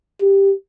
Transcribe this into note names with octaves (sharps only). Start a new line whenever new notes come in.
G4